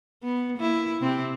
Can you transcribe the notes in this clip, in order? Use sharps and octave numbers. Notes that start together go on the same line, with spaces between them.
B3
A#3 E4
C3 C4